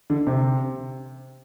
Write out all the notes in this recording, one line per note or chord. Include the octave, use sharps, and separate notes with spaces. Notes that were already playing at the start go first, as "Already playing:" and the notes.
D3
C3